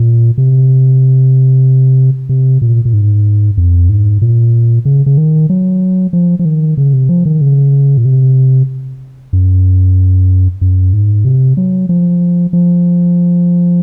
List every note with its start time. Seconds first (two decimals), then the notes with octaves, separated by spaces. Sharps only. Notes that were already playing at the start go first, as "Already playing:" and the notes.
Already playing: A#2
0.38 C3
2.29 C3
2.62 A#2
2.85 A#2
2.93 G#2
3.57 F2
3.89 G#2
4.22 A#2
4.85 C#3
5.06 C#3
5.18 D#3
5.50 F#3
6.13 F3
6.39 F3
6.45 D#3
6.77 C#3
6.93 C3
7.09 F3
7.25 D#3
7.41 C#3
7.97 A#2
8.05 C3
9.33 F#2
10.61 F#2
10.93 G#2
11.25 C3
11.57 F#3
11.89 F3
12.53 F3